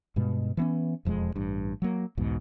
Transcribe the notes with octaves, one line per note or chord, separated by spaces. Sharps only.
G2 B2 G#3
E3 B3 C#4
E1 F2 E3 G#3
A1 G2
F#3 A#3
B1 E2 G#2 B2